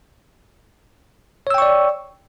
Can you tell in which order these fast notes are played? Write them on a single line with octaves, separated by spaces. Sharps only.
C#5 E6 G5 C#6 D5